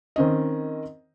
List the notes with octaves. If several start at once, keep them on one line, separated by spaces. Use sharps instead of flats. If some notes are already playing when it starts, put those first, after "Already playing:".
D#3 C4 C#4 D#5